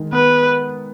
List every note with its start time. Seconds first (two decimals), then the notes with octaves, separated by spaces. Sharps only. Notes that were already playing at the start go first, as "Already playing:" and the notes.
Already playing: D#3 G#3
0.13 B3 B4